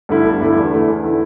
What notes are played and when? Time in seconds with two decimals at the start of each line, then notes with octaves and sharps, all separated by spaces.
0.09 G2 D3 A3 E4
0.25 G1
0.41 G2 D3 A3 E4
0.56 E2
0.72 D3 A3 E4
0.88 E2
1.04 D3 A3 E4